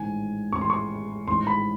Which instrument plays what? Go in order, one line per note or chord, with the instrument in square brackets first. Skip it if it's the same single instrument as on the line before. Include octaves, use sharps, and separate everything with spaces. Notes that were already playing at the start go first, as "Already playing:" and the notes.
Already playing: [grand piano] A1 G#2 D#3 [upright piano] G#5
[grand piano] A1 G#2 D#3 [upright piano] C#6
[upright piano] C6
C#6
[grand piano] A1 G#2 D#3 [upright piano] C6
[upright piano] B5